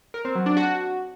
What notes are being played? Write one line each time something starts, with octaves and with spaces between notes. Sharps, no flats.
A#4
C4
F#3
D4
F#4